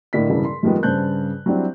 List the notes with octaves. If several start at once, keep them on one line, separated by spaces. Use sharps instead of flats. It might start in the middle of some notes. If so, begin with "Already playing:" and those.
A2 D3 A#3 D5 D#5 B6
E1 G2 C#3 E3
C6
F#2 D#3 F3 G3 G#3 B3
G2 C#3 C5 A5 F#6 G6
F#3 G3 C4 D4 E4